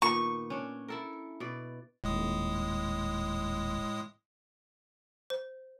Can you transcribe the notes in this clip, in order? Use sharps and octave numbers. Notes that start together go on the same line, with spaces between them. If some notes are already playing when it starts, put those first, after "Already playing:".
A#2 D#3 B3 C#6
C#4 D4 C#5
E4 A4 A#4
B2 D5
D#1 A2 G#3 D#6
C5